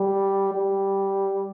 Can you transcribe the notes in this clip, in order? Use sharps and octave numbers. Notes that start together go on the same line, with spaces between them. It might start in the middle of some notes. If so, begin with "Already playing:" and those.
Already playing: G3
G3